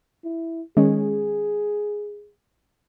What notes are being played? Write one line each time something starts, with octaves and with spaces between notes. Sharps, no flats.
E4
D#3 G#3 C#4 G#4